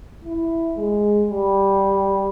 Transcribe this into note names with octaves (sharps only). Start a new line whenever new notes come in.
E4
G#3
G3